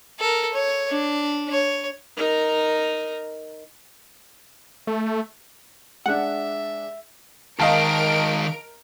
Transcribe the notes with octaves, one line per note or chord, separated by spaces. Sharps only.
A4 A#4
C#5
D4
C#5
D#4 A#4
A3
G#3 D4 E5 F#5
D#3 G#3 A#4 D#5 F5 A5 D7